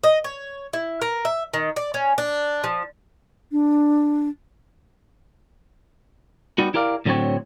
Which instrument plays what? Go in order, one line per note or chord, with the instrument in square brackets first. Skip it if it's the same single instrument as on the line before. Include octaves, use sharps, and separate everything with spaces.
[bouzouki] D#5
C#5
E4
A#4
E5
D#3
D5
C#4
D4
F3
[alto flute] D4
[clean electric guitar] G3 B3 D#4 F#4
E4 G4 A#4 D5 F5
A2 D3 F#3 G#3 C4 C#5